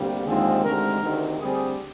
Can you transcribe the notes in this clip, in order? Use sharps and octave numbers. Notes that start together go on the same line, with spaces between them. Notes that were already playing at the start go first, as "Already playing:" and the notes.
Already playing: D2 C3 G3 A#3
D#2 D3 F3 G#3 C4 G#4
D2 C3 D#3 G#3 A#4
D2 C3 D#3
D2 D3 G3 C4 G#4